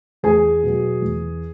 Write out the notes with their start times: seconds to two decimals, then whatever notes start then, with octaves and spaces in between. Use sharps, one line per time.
0.23 E2 G#4 G#5
0.63 B2 F#3
1.02 E2